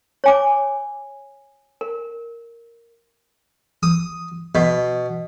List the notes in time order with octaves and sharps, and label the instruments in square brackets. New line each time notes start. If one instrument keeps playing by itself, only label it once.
[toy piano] C#5 G#5 D6
A#4
[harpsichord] D#6
B2